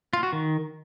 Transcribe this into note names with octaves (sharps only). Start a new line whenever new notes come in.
F4
F#4
D#3